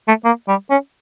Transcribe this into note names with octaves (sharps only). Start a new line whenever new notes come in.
A3
A#3
G3
C#4